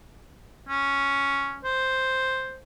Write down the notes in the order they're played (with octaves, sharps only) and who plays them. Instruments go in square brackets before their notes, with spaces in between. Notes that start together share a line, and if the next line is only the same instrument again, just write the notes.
[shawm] C#4
C5